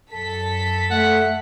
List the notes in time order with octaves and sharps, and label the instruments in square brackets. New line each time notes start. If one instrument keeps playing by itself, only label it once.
[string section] F#2 A4 B6
[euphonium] A3 [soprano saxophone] F#5